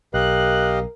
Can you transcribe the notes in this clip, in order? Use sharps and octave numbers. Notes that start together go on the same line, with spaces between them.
B1 G4 A#4 D#5 F5 F#6